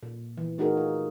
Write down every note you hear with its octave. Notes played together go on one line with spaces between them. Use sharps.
A#2
E3
A3 D#4 F#4 G#4 A#4
F4